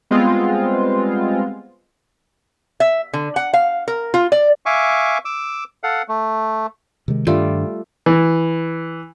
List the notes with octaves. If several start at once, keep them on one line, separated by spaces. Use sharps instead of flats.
G3 G#3 B3 C4 F4
E5
D3
F#5
F5
A#4
F4
D5
E5 F5 G#5 C#6 D6
D6 E6
A4 F5 F#5
A3
C3 D#3 G#3
G2 D#3 G3 A3 D4 F4
E3